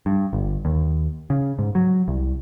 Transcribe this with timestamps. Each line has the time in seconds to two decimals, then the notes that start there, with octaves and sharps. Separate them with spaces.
0.06 G2
0.33 G1
0.65 D#2
1.30 C#3
1.59 G#2
1.75 F#3
2.08 C2